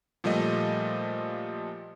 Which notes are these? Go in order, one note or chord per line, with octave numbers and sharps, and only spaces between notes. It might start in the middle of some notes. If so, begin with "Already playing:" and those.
A#2 F3 G3 A3 D#5